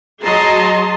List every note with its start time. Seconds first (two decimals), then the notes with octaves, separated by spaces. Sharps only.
0.24 F#3 G#4 D#5 A5 A#5 C6